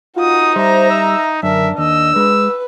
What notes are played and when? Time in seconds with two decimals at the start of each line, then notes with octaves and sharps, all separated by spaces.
0.16 D#4 F4 F#4 D#6
0.56 G3 C5 E5 A#5
0.90 E6
1.43 F#2 D3 D4 A#4 E5
1.78 D#2 D4 D#5 E6
2.16 G#3 B4